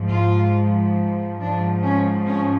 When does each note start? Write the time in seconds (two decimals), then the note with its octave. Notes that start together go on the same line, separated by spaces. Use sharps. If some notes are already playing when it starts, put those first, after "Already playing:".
Already playing: G#2 F3
0.10 F4
1.39 G#2 F3 D4
1.82 C#4
2.25 C#4